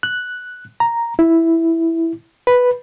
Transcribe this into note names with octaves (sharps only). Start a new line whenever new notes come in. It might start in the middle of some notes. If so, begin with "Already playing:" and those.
F#6
A#5
E4
B4